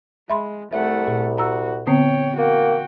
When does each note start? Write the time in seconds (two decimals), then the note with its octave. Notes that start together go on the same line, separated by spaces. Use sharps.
0.30 G#3 E5 B5 C6
0.73 C2 A3 E5 F#5
1.08 A#2
1.38 F#4 A#5 E6
1.87 D3 B3 C4 C#5 G5
2.38 A#3 F#4 G5